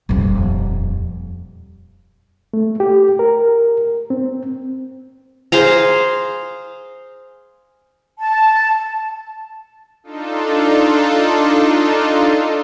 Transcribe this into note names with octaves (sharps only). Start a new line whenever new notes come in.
D#1 F2
A3
G4
A#4
C4
G#4 C5 F5 A#5
A5
D4 D#4 F4 A4